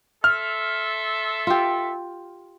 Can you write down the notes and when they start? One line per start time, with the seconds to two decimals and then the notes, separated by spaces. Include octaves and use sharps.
0.24 A4 E5 C6 F6
1.47 F4 G4